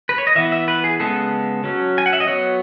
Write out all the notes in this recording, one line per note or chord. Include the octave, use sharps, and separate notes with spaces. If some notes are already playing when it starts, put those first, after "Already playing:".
B4
C#5
D#5
E3 B3 E5
E5
B4
G#4
C#3 G#3 B3 A4
F#3 C#4
G#5
F#5
E5
D#5
F#3 B3 C#5